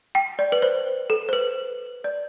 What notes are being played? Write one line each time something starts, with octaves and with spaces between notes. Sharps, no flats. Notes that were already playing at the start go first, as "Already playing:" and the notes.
G5
D5
B4
C5
A4
C5
B4
D5